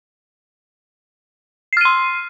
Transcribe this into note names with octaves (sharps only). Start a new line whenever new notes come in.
C6 F6 C7 D#7